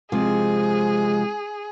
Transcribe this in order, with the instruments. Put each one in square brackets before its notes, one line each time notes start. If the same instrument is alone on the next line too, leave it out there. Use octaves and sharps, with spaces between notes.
[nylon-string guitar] C3 F3 [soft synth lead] G#3 [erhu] G#4